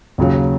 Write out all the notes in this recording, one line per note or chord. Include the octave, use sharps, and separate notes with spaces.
D#2 C#3 F#3